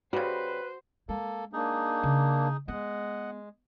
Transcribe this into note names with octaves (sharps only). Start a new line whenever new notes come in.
C#3 G3 F#4 B4 C5
G#3 A#3 A4
A#3 D4 D#4 G#4
C#3
G#3 B3 D#5 F#5